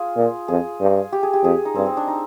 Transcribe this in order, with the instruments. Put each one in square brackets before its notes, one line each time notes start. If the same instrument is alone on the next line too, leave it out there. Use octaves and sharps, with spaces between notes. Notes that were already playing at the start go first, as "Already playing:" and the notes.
Already playing: [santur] F4 G#4
[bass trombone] A#2
[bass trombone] F2 [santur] G#4
[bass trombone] G2
[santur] G4
G#4
G4
[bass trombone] F2 [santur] G#4
[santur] D#4
[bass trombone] G2 [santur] C4
[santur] C4
D4
D#4